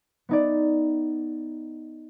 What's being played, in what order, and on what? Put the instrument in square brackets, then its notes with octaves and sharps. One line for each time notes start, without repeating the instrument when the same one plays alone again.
[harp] B3 D#4 D5